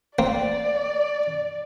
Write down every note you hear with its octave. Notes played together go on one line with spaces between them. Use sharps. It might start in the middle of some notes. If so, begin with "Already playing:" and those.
A#3 C4 D5